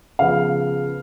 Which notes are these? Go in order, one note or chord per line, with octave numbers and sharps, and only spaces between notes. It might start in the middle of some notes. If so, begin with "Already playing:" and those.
C#3 F3 B3 F5